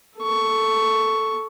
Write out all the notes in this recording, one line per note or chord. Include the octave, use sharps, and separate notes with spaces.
A4 C#6